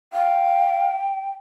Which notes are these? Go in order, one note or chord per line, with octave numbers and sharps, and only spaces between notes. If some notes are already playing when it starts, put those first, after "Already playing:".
F5 G5